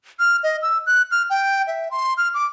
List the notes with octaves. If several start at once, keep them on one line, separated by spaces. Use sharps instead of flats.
F6
D#5
E6
F#6
F6
G5
E5
C6
F6
D6